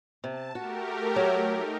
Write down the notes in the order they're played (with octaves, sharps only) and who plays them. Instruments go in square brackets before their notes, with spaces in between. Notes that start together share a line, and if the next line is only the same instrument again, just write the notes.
[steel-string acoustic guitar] C3 [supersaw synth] A5
[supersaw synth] A3 G4 A#4 [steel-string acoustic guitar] F#4
[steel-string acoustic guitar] F#3
[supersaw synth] D#4